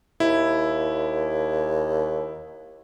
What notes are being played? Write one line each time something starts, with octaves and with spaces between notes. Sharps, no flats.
D#2 E4